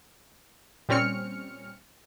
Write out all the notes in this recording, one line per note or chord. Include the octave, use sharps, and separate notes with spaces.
A#2 G3 C4 C#4 F6 C#7